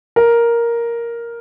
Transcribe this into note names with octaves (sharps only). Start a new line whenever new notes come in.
A#4